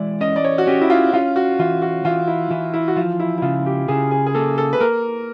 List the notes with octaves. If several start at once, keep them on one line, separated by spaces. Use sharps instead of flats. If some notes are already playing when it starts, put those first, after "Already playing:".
Already playing: E3 G#3 D5
C#4 D#5
D5
C#5
F#4
C#4 G4
E4
F4
C#4 F4
F#4
E3 F4
F#4
E3 F4
E4
E3 E4
E4
F#4
F3 F4
E4
E4
C#3 F4
G4
C#3 G#4
G#4
G#4
A#3 A4
A4
B4
A#3 A#4